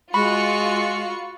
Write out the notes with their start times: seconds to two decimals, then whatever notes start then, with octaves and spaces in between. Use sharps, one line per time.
0.14 G#3 F4 F#4 B5 C#7